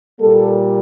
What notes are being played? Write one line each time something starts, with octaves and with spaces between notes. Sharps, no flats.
A#2 G3 A#3 A4